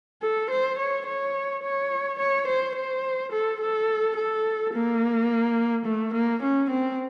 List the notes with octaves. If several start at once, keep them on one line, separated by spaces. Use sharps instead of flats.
A4
C5
C#5
C#5
C#5
C#5
C5
C5
A4
A4
A4
A#3
A3
A#3
C#4
C4